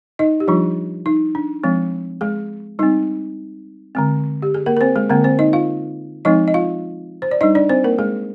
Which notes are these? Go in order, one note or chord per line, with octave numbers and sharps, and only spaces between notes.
D#4 D#5
G4
F3 G3 D4 F4
D#4
D4
F3 G#3 C4
G#3 G#4
G3 C4 D#4
D3 G#3 C4
G4
G#4
A#3 A#4
A#4
C4 C5
G#3 G#4
D3 G#3 A#3 C4 A#4
C4 C5
D#4 D#5
F4 F5
F3 G#3 C4 D#4 D#5
D#5
F4 F5
C5
D5
G3 D4 D#4 D#5
D4 D5
C4 C5
A#3 A#4
G#3 G#4